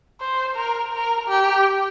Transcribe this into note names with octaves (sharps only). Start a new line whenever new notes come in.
C5
A#4
A#4
G4